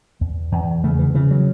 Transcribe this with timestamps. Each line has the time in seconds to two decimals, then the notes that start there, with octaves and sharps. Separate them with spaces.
0.21 E2
0.52 E2
0.84 C#3 A3
0.99 E3
1.15 C#3 E3
1.31 F#3